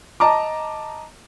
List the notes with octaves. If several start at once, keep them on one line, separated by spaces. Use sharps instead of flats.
D#5 A5 A#5 D6